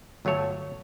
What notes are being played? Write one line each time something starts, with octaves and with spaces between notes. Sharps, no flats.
G1 F#3 A3 C#5 A5